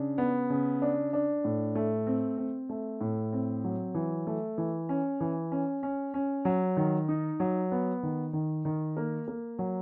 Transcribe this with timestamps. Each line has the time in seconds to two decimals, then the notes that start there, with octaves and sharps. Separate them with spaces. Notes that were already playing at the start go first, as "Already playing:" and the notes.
Already playing: C#3 D4
0.18 B3
0.50 C#3
0.82 D4
1.13 D4
1.44 A2
1.75 A3
2.07 C4
2.38 C4
2.69 A3
3.01 A2
3.33 C4
3.64 F#3
3.94 E3
4.27 A3
4.58 E3
4.89 C#4
5.20 E3
5.52 C#4
5.83 C#4
6.14 C#4
6.45 F#3
6.77 D#3
7.08 D#4
7.40 F#3
7.72 B3
8.03 D#3
8.33 D#3
8.65 D#3
8.97 A#3
9.28 A#3
9.59 F#3